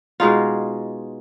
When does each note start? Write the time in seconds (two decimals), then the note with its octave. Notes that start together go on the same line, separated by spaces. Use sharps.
0.20 B2 G#3 D#4 F4